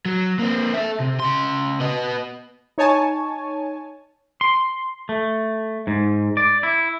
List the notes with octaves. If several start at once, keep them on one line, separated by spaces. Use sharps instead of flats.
F#3
A#3 C4
A4 E5
C3
C#3 C6
B3 D#5
D#4 C#5 G#5 A5
C6
A3
G#2
D5
E4